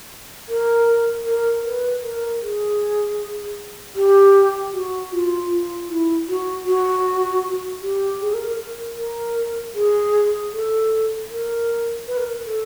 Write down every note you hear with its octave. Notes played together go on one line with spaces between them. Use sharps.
A#4
A#4
B4
A#4
G#4
G4
F#4
F4
F4
E4
F#4
F#4
G4
G#4
A#4
A#4
A#4
A#4
G#4
A4
A#4
B4
A#4
A4